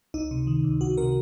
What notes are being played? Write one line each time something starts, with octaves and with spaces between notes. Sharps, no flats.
C#2 D#4
C3
D#3
C#2
C#2 F#4
C3 A#4